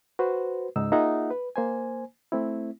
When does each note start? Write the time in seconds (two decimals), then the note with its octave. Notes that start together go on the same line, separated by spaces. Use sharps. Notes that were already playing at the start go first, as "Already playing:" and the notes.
0.19 F#4 B4 C5
0.76 C#2 G#2 D#4 E6
0.92 A#3 D#4 F4 G#4 E5 F#5
1.31 B4
1.56 A#3 C5 G#5
2.32 A3 C4 E4